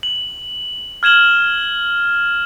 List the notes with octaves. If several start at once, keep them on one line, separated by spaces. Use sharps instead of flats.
F#7
F6 G#6 E7 F#7 G7